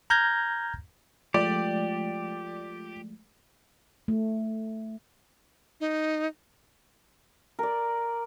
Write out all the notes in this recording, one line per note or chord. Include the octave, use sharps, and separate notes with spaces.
A#5 F6 G6 G#6 A#6
F3 G#3 A3 F4 G4 D5
A3
D#4
A#4 D5